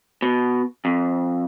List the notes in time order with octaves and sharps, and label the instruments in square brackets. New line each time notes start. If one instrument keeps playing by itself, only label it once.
[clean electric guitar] B2
F2